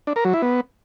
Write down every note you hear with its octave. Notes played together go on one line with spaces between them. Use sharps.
D4
A#4
F#3
E4
B3